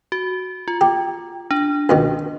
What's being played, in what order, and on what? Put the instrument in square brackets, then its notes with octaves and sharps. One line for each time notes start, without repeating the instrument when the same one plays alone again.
[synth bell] F#4
F4
[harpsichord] G4
[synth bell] D4
[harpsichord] C#2 B2 D#3